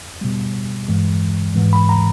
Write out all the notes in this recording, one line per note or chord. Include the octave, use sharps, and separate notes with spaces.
B2 G3
G2 E3 G#3
G#2 E3 G#3
B5
A#5